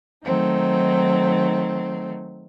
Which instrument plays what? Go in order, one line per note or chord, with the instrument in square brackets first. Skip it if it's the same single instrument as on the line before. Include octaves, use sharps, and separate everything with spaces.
[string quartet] D#3 F#3 A3 C4 D#4